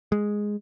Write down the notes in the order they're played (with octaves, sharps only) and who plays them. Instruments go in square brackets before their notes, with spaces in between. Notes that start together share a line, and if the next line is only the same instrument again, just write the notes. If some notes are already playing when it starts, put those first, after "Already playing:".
[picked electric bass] G#3